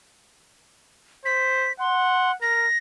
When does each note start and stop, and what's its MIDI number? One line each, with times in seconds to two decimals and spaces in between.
1.25 1.72 72
1.25 1.72 95
1.80 2.35 78
1.80 2.32 84
2.42 2.66 70
2.42 2.78 94